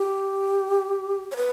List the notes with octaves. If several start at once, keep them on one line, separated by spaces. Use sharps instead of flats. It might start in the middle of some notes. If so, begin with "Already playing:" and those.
Already playing: G4
C#5
B4